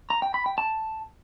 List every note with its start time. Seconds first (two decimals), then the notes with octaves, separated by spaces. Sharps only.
0.10 A#5
0.22 G5
0.34 B5
0.46 G5
0.58 A5